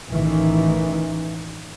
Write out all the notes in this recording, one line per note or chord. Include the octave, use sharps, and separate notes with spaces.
A1 D#3 E3